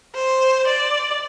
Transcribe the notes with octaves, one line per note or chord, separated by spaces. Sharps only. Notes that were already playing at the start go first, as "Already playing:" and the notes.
C5
D5